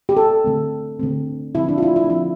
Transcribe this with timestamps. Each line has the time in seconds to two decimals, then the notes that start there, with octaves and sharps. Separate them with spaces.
0.09 G4
0.17 A4
0.44 D3 A3 C4
1.00 D3 A3 C4
1.55 D3 F3 C4 E4
1.69 D4
1.78 F4
1.82 E4
1.96 E4
2.04 D4
2.10 D3 F3 C4 E4